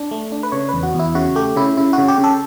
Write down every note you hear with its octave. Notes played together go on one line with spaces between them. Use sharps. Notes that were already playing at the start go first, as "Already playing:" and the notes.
Already playing: D4
A3
D4
B4
C#3 C#5
E2 B4
F#4
E2
E4
C#3 F#4
A3 G4
C#3 E4
C#3 E4
F#4
C#3
G4
C#3
A4